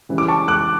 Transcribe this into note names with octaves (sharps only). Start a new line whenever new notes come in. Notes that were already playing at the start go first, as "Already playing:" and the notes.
C#3 E3 G3
D6
A5 C#6
D6 F#6